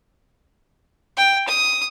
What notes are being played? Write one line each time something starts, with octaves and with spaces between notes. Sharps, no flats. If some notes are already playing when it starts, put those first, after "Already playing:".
G5
D#6